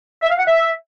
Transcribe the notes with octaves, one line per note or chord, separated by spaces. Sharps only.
E5
F5
F#5
E5